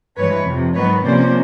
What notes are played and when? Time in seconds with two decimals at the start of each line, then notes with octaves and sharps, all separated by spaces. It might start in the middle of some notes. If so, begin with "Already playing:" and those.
0.17 G2 E3 G#3 B4 C#5
0.46 F2 C3 F3
0.74 G#2 D#3 F#3 B3 B4 C#5
1.04 C3 F3 A#3 C#4 C5 D5